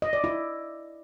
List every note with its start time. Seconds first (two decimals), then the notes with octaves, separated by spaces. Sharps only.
0.02 D#5
0.13 D5
0.24 E4